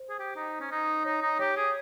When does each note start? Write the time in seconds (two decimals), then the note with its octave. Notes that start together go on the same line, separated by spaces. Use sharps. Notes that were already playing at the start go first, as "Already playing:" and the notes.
Already playing: C5
0.09 G#4
0.19 G4
0.36 D#4
0.60 C#4
0.71 D#4
1.05 D#4 C#5
1.22 D#4
1.39 G4 C#5
1.57 G#4